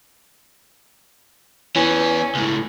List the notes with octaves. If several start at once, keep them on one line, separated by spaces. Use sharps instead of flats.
E3 B3 C#4
C#2 A2